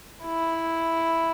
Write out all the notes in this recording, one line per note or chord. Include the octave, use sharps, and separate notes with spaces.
E4